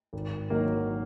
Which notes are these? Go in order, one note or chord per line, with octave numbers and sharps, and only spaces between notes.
G#1
D#3 F#3 A#3